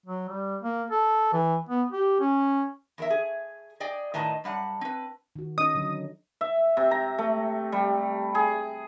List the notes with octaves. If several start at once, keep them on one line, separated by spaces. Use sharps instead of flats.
F#3
G3
A#3
A4
E3
B3
G4
C#4
E2 A#4 E5
G#4
G#4 D5 D#5 G5
A2 D#3 B4 D#5 A5 A#5
F#2 G3 F#5 A5
C4 B4
D#3 F#4
C#4 D#4 D#5 D#6
D3 F#3
E5
C3
A#5
A3
G3
G#4